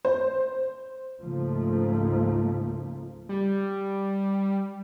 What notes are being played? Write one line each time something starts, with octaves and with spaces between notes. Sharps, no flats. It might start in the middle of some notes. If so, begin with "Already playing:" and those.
C5
C#2 G#2 C#3 F3 A3 A#3
G3